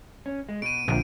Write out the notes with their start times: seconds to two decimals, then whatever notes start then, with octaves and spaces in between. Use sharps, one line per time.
0.26 C#4
0.49 G#3
0.62 B2 D7 D#7
0.88 A#1 F2 D3 F3